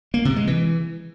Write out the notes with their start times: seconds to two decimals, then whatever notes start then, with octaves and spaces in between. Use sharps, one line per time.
0.14 A#3
0.25 C3
0.36 G#3
0.47 E3